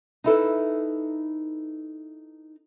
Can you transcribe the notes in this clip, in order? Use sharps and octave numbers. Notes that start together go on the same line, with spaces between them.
D#4 E4 A4 B4